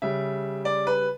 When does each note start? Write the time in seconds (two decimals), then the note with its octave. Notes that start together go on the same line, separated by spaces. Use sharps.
0.02 C#3 G3 E5
0.65 D5
0.87 B4